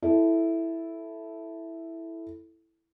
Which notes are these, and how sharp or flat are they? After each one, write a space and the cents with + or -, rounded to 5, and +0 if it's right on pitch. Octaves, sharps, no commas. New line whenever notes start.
E4 +0 A4 -5